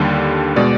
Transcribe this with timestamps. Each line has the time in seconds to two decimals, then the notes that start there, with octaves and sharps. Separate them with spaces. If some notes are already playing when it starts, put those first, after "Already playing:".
Already playing: D#2 D3 G3
0.56 B2 G#3 D5